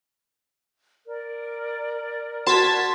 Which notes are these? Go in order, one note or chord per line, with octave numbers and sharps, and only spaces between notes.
A#4 D5
F#4 A5 C6 G#6 B6